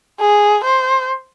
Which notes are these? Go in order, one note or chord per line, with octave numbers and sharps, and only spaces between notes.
G#4
C5